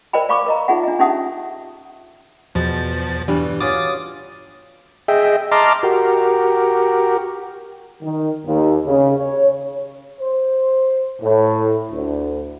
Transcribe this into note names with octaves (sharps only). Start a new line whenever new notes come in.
A#4 C5 D5 D#5 G5 B5
D5 F5 B5 C#6 D6
A#4 D#5 A#5
D#4 F4 G#4 E5 F#5
D4 D#5
C#4 D#4 G4 E5 F#5 D#6
E2 B2 F3 A6
G2 E3 G3
C#4 F4 F#4 D6 D#6 A6
G#4 D#5 E5 G5
D#5 A5 A#5 C6 D6 F6
F#4 G4 A#4
D#3
D#2
C#3
C#5
C5
A2
D2